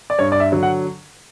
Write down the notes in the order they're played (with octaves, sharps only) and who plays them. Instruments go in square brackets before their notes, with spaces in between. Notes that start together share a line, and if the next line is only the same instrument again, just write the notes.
[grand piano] D5
G2 C#5
D5
E5
D3 F#3
F#5